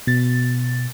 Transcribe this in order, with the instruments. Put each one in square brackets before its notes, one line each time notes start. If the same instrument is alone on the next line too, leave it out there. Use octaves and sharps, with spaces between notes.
[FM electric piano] B2 A6